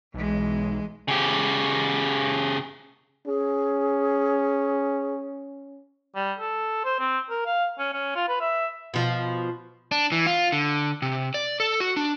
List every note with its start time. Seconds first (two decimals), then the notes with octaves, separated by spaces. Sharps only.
0.14 B1 E3 G#3
1.08 C#3 G4
3.27 C#4 G#4
6.16 G3
6.39 A4
6.84 C5
6.99 C4
7.30 A#4
7.46 F5
7.79 C#4
7.93 C#4
8.16 F4
8.28 B4
8.41 E5
8.94 B2 F3
9.92 D4
10.12 E3
10.26 F4
10.52 D3
11.02 C3
11.34 D5
11.60 A4
11.80 F#4
11.97 D4